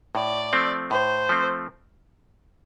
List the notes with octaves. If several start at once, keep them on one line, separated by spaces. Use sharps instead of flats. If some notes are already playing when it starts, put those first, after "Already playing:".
A2 D5
F3 A3 C4
A2 C5
F3 A3 C4